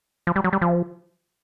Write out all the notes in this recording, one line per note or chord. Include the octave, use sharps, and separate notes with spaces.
F3
G3
F#3
G3
F3